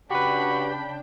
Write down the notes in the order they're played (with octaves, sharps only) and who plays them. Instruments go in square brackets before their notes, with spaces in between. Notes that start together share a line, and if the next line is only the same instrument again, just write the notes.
[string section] C#3 D4 G5 [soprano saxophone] F#4 [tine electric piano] G4 B4 [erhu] B5